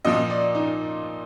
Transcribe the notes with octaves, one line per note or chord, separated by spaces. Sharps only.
A#2 F3 D#5
D5
D#4